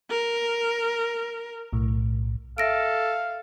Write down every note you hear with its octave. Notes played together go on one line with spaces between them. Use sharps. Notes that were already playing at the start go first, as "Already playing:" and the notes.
A#4
B1 A2
A4 E5 F5 A#6 D7